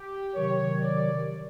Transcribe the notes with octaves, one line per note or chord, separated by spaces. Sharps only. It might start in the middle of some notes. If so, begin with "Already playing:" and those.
Already playing: G4
C3 D#3 F#3 C#5
D5